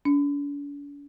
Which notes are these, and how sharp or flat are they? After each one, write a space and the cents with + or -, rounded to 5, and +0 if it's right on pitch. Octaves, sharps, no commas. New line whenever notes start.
D4 -45